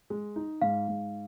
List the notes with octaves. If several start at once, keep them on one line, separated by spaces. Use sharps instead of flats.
G#3
D#4
G#2 F5
G#2